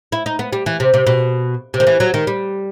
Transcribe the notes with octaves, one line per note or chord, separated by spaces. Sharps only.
E4
D#4
B3
G3
E3
C3
C3
B2
C3
D#3
E3
F#3
D#3
G3